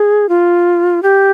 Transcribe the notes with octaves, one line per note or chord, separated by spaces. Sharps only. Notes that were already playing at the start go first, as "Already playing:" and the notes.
Already playing: G#4
F4
G4